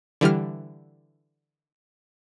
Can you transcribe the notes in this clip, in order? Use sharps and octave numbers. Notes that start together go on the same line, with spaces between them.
D3 E3 G3 F6